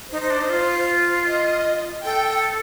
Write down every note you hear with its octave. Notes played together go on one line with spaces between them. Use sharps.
D#4 C5
D#4
D4
D#4
F4
D#5
A4 G5